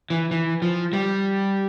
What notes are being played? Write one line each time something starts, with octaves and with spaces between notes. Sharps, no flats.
E3
E3
F3
G3